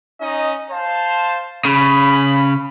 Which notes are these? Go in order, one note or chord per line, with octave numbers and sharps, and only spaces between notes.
C#4 D#4 D#5
C5 F5 A5
C#3 B5